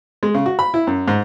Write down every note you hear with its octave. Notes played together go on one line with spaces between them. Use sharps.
G#3
C#3
F#4
B5
E4
F#2
G#2